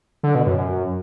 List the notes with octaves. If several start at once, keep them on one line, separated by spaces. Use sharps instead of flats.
D3
B2
F#2
F#2